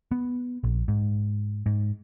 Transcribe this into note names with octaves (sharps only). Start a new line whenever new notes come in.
B3
A#1
G#2
G#2